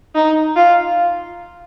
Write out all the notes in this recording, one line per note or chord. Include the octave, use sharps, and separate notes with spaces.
D#4
F4